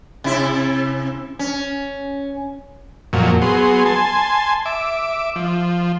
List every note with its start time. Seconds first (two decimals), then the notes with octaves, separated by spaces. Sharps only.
0.24 C3 E4
1.39 C#4
3.13 F2 A#2 F#3
3.42 F#3 B3 G#4 C6
3.86 G#5 A5 C6
4.65 E5 D6
5.36 F3